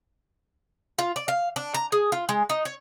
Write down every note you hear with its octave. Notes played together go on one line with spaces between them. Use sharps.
F4
D5
F5
D4
A#5
G#4
F4
G#3
D#4
C#5